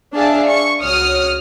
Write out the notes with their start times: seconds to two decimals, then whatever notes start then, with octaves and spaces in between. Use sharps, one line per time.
0.14 D4 G#4 D5 E5 F5 A5
0.47 C#6
0.81 C#2 F#4 C#5 D#6 F6